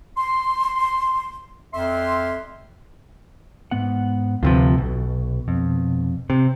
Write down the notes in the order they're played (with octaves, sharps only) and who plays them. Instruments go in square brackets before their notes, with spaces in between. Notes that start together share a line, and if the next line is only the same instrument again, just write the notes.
[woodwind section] C6
F2 E5 C6
[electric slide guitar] G#2 B3 F#5
[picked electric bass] D2 C3 F3 [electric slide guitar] F4 B4
[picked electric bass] B1 [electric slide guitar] B2
[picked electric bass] F2
[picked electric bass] C3 [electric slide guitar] C5